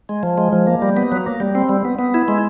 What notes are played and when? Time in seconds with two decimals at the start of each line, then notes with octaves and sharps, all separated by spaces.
0.09 G#3
0.23 F3
0.38 G#3
0.53 F3
0.67 A#3
0.82 G3
0.97 B3
1.12 F#3
1.26 A#3
1.40 G3
1.55 C4
1.69 G3
1.85 B3
1.99 B3
2.14 E4
2.28 G#3